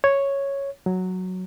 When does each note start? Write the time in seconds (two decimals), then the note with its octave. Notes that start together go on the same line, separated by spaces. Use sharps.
0.04 C#5
0.86 F#3